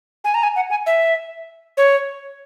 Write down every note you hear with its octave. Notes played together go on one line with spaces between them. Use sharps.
G#5
A#5
G#5
F#5
G#5
E5
C#5